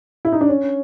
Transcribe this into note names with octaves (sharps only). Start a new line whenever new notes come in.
E4
D#4
D4
C#4